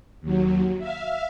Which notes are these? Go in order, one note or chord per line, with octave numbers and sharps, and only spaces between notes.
D#2 F#3
E5 F5